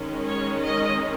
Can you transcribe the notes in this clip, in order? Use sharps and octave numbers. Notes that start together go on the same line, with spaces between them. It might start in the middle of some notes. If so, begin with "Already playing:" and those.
Already playing: D#3 G#3 C#4
C#5
D#5